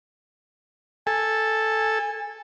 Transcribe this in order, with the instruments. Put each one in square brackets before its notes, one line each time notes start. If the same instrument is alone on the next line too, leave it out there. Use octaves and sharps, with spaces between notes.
[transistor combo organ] A4 [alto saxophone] G#5